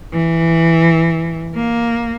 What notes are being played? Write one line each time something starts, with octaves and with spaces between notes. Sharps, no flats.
E3
A#3